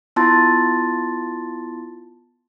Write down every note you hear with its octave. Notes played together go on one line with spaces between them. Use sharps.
B3 E4 F4 A5 C6 A6